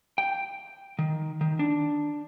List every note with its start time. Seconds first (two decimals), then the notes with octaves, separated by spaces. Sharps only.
0.18 G5
0.99 D#3
1.41 D#3
1.59 D4